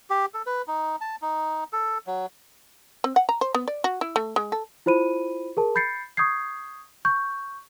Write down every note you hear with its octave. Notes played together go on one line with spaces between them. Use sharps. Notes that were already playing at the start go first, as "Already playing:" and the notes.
G4
A4
B4
D#4
A5
D#4
A4
F#3
C4
F#5
A#5
C5
B3
D5
F#4
E4
A3
G#3
A4
E4 F4 C5 B5 D#7
G#4 A#4 A5
B5 G6 A6 C7 C#7
C#6 D#6 G6 G#6 C7
C#6 G6